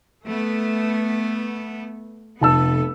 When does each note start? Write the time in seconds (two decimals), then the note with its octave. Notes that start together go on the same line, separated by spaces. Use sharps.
0.27 A3 B3
2.41 F1 B3 A4 A5 E6